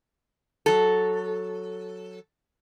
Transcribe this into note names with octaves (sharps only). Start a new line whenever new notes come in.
F#3 A4